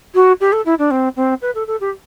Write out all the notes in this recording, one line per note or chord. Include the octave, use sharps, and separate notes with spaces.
F#4
G4
A4
E4
D4
C4
C4
B4
A4
A4
G4